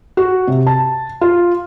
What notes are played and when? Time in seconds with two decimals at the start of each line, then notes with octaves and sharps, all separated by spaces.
0.17 F#4
0.48 C3
0.67 A5
1.21 F4